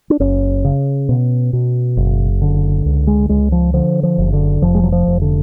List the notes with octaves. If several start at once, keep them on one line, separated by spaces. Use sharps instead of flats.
D4
F#1 C#4
C#3
B2
B2
F#1
D3
C#2
G#3
C#2 G#3
F3
D3 F3
F3
F#1
D3
F1 F3
G#3
F#3
F3
F1
D3